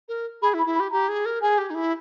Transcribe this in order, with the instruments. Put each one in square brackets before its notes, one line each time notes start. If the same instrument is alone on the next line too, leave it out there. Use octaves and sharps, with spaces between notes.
[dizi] A#4
[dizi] G#4 [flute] B5
[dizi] E4
[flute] B5
[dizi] E4
[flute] B5
[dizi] G4
[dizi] G4 [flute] A#5
[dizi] G#4
A#4
[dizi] G#4 [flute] G#5
[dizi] G4
D#4
E4